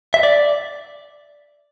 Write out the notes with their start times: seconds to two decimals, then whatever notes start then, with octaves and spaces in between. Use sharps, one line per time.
0.14 E5
0.23 D5